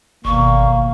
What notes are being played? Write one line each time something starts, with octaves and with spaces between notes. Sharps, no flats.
G1 D#2 B2 A#3 C#6